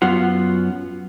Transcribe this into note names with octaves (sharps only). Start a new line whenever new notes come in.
F#2 B3 F4 F#5